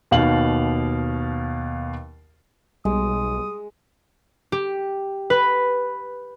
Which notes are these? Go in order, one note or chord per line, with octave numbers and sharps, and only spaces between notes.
D#2 B2 F5 F#7
B1 G3 G#3 D#6
G4
B4